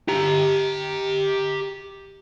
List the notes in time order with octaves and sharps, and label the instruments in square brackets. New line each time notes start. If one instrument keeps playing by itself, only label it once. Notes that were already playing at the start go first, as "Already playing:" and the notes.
[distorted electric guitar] G4 A#5